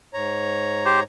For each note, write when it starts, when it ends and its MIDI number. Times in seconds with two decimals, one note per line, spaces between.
0.14 1.03 44
0.14 1.03 73
0.14 1.03 82
0.85 1.00 67
0.85 1.00 72